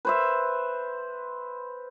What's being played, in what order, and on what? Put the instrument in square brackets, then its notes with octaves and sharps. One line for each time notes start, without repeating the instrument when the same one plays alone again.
[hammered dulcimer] B4 C5 E5